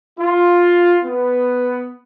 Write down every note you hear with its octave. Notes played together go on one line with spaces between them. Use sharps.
F4
B3